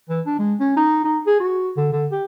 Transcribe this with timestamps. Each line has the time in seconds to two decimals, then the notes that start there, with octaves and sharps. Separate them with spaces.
0.09 E3
0.26 D4
0.39 G#3
0.60 C#4
0.77 D#4
1.04 D#4
1.27 G#4
1.40 F#4
1.77 D3
1.92 D3
2.11 G4